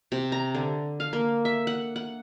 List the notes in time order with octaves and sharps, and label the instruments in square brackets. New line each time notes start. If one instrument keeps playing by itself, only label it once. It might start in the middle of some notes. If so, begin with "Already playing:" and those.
[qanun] C3
A#5
D3
F5
A#3
E5
F#5
F#5